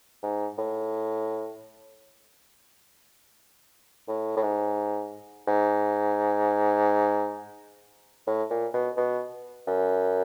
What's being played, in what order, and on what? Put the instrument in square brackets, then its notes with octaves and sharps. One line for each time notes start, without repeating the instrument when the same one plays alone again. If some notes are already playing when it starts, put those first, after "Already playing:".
[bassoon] G#2
A2
A2
A2
G#2
G#2
A2
A#2
B2
B2
F#2